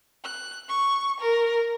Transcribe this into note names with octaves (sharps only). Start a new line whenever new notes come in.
F#6
C#6
A#4